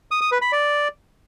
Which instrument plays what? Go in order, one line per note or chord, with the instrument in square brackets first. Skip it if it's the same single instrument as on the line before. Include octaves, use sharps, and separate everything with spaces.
[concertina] D#6
D#6
B4
B5
D5